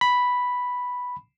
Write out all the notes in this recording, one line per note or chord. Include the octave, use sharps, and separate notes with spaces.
B5